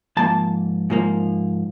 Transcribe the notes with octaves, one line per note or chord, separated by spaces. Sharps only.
G#2 F3 A#3 A5
G#2 F3 A#3